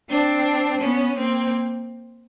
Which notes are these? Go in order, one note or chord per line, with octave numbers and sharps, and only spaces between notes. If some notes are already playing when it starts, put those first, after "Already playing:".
C4 D4
B3 C#4
A#3 C4